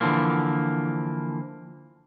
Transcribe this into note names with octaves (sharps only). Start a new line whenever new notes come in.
D3 E3 F3 A#3